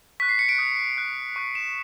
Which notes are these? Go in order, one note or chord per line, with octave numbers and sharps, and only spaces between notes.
C#6 F#6 B6
C7
C#7
D7
D#6 F#6
C#6 F#6
C#6 F#6
E7